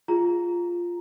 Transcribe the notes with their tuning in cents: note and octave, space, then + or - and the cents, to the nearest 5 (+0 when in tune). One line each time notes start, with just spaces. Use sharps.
F4 +0 G#4 +0 A#5 +0